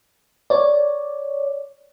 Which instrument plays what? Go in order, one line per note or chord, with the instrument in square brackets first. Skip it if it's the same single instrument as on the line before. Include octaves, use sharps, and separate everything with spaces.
[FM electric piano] C#5 D5